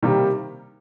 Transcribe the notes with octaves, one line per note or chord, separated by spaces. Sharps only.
C3 D#3 G3 A#3 G4